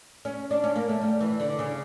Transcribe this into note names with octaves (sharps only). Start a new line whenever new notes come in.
C#4
D4
C#4
A#3
A3
G3
E3
D3
C#3